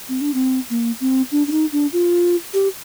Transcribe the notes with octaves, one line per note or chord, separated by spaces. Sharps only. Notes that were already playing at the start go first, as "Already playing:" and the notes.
C4
D4
C4
A#3
C4
D4
D4
D#4
D4
F4
G4